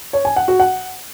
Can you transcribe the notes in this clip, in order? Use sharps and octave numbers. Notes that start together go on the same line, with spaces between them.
C#5
G#5
F#5
F#4
F#5